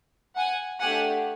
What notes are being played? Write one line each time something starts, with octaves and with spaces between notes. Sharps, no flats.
F#5 G#5
A3 D4 G4 F#5 G#5